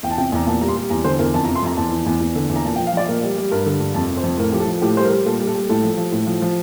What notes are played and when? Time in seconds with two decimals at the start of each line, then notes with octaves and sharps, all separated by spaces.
0.03 E2 G5
0.10 A5
0.18 C3 G5
0.32 E2 A#5
0.47 A#2 A5
0.61 G3 A#5
0.68 C6
0.76 G3
0.90 E2 A#5
1.04 D3 C5
1.19 E2 A#4
1.34 F2 A5
1.45 A#5
1.48 C3
1.55 C6
1.62 F2 A#5
1.77 E2 A5
1.92 E3
2.06 E2
2.21 E2
2.35 D3
2.49 E2
2.56 A#5
2.65 A#2 A5
2.76 G5
2.79 F3
2.87 F5
2.93 F3 D5
3.08 A#2 A#4
3.23 G3
3.37 G3
3.51 G2 A#4
3.66 D3
3.80 G2
3.94 F2 A5
4.10 C3
4.17 C5
4.23 F2
4.38 A2 A#4
4.52 F3 G4
4.60 A4
4.67 F3
4.82 A2 G4
4.97 G3 C5
5.04 A#4
5.11 G3
5.26 A#2 A4
5.39 G3
5.47 A4
5.55 G3
5.70 A2 A4
5.84 F3
5.98 F3
6.12 A2
6.27 F3
6.42 F3